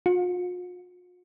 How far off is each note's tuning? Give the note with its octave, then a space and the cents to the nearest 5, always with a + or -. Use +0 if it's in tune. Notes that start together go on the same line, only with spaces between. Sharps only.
F4 +45